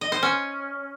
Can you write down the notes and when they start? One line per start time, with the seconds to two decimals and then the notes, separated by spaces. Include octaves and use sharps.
0.01 D#5
0.12 C5
0.23 C#4